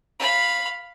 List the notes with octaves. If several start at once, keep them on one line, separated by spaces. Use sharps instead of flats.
F5 B5